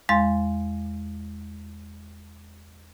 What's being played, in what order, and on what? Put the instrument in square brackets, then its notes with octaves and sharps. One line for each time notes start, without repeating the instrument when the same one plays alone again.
[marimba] E2 G#3 F5 C6 A6